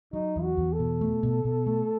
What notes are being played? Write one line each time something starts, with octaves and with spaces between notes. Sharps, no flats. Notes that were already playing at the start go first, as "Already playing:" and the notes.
F#3 D#4
E2
F#4
E2
A4
B2
A3
B2
B2
A3